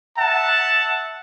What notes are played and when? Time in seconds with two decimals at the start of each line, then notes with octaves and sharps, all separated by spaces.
0.17 E5 F#5 A5